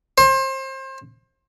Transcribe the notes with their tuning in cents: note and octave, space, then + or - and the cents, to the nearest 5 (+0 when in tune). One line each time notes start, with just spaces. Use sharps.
C5 +30